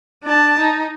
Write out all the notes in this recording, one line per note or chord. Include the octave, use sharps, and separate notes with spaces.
D4 A5
D#4